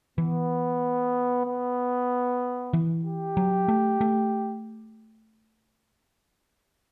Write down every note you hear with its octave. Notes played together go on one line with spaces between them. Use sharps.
E3 B3
B3
E3
G4
F#3
A3
A3